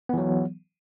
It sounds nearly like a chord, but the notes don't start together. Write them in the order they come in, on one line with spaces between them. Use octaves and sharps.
B3 E3 F#3